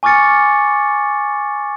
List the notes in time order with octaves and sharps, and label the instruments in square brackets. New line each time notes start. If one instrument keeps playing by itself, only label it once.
[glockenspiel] G#5 C#6 D6 F6 A6 C#7